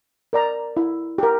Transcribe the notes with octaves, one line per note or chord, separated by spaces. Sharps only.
A#4 D5 A#5
E4
G4 A#4